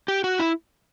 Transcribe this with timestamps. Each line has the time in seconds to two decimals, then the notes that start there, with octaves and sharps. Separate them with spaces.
0.08 G4
0.24 F#4
0.39 E4